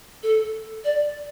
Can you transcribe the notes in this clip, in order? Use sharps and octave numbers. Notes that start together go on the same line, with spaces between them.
A4
D5